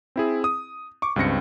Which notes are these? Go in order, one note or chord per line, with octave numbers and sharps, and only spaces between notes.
C4 E4 G#4
D#6
C#6 D6
C#2 G2 C4 A#6 C#7